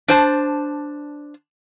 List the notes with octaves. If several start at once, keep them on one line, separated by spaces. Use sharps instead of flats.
D4 C5 A5